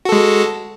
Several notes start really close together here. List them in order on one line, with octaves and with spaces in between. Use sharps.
F#4 A4 G#3